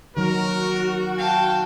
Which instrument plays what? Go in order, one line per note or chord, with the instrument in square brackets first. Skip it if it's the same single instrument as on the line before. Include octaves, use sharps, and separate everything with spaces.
[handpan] D#3 F#3 [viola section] F#4 [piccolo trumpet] A#4
[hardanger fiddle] F5 A5 [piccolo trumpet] G5